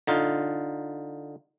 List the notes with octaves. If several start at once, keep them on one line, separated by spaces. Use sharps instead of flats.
D3 D#4 F4